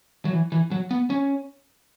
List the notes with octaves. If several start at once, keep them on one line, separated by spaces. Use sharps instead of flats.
F#3
E3
E3
F#3
B3
C#4